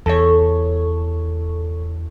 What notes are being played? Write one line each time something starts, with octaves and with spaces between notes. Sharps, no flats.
E2 A4 C#5